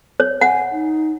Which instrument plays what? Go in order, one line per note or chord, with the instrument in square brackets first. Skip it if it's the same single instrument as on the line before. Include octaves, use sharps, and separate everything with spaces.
[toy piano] C#5
[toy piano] F#5 [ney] G#5
[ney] D#4